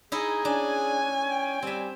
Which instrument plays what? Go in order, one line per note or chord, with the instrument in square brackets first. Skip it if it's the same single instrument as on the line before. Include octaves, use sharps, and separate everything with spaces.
[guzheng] D#4 E4 D#5 [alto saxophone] G#4
[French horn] C#4 [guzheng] D4 [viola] G#5
[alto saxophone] G5
[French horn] G3 [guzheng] C4 E5